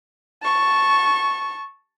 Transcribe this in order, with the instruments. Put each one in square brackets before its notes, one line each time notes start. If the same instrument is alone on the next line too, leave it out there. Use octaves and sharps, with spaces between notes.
[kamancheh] A5 C#6